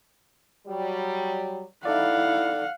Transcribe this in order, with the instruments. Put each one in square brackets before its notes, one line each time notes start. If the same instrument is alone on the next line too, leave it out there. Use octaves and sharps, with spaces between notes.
[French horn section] F#3 G3
[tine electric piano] D#4 A4 D5 [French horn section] E4 [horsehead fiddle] F5 F#5